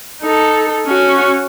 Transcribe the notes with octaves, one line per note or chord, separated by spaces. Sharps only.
D#4 A4
C#4 F#4